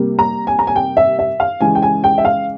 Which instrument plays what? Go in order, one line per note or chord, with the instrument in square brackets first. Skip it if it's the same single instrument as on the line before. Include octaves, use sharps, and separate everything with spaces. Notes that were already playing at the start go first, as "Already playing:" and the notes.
Already playing: [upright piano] C3 G3 A#3
A#5
G#5
A#5
G#5
G5
E5
E5
F5
C#3 E3 G#3 G#5
G5
G#5
G5
E5
F5